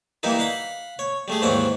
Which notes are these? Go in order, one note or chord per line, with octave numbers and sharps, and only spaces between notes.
E3 G3 A#3 D#4 E4
F5 F#5 B5
C#5
G3 A3 G#4
D#2 G#2 E3 C4 C#5 F#5